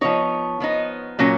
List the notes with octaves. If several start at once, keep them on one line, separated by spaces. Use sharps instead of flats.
F3 B3 D#4 C#5
F3 B3 D#4
A#2 F#3 A#3 C#4